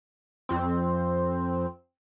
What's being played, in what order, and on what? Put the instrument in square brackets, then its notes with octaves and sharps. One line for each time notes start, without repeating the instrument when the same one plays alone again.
[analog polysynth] F2 C4